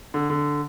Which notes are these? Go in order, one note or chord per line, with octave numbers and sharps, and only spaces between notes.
D3
D3